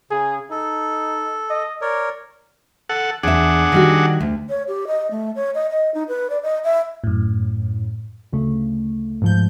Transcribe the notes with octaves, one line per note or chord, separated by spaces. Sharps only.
C#3 G#4
D#4 A4
D#5
A#4 C#5 D5
A4 F#5
E2 D4 G#4 E5 F#5
D#3 G3 F#4
D2
C#5
G4
D#5
A3
C#5
D#5
D#5
D#4
B4
D5
D#5
E5
F#2 A2
D2 C#3 A3
G#2 F3 G6